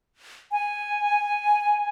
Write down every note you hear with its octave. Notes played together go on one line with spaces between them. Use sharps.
G#5